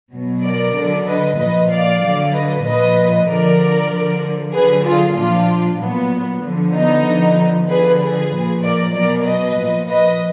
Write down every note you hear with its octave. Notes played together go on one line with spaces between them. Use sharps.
B2 F#3
A#4 D5
D3 F#3
B4 D#5
A#2 F3 B4 D#5
D5 F5
D3 F#3
B4 D#5
A#2 F3 B4 D#5
D3 F3 A#4 D5
D3 F3
D3 F#3 G#4 B4
F4 G#4
A#2 F3 D4 F4
A#2 F#3 B3
D3 F3
B3 D#4
D3 F3
D3 F3 G#4 B4
G#4 B4
A#2 F3
A#4 D5
B2 F#3 A#4 D5
B4 D#5
A#2 F3
B4 D#5